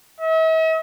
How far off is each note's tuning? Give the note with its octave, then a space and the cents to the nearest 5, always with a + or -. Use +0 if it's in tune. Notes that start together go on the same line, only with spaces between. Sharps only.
E5 -45